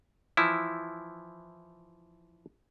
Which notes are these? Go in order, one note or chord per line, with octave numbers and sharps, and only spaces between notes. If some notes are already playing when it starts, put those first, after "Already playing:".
E3 F3 E4